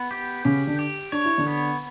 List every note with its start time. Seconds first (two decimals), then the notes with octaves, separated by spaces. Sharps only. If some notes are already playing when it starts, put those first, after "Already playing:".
Already playing: B3
0.11 G4
0.45 C#3 C#4 G4
0.67 D3 D4
0.79 G4
1.12 D4 C#5
1.25 E4
1.38 D3 D4
1.47 B3